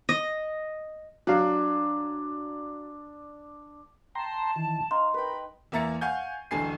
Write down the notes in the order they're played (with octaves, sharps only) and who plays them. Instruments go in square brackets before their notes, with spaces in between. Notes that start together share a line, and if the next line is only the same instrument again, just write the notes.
[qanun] D#5
[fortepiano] F#3 F5 [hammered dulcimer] D4
[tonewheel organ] G5 A#5 C6 [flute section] A5
[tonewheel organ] D#3 E3
[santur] D#4 [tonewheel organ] F5 [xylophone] C6
[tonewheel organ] A#4 [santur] B4 G5 [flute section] B5
[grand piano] E2 A#3 E5 A#5 A6 C#7
F5 F#5 G#5 C#6 G6
D1 A1 D3 G#5 C7